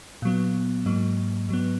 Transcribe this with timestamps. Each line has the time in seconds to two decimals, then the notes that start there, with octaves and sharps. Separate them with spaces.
0.22 A#2 F#3 B3
0.86 G#2 F#3 A#3
1.49 G#2 F#3 B3